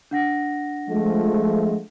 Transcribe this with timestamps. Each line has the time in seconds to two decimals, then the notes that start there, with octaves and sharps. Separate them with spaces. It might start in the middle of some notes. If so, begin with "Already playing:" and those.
0.11 D4 F#5 A#6
0.89 F3 G#3 A3